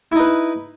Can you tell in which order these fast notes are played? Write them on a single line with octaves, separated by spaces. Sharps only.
E4 D#4 B4